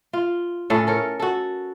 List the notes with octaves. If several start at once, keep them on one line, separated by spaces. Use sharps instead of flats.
F4
A2 C#4 A4
A4 A#4 C#5
F#4 A4